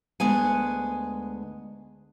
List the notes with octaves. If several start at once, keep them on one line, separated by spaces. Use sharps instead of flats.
D2 G#3 B3 G#5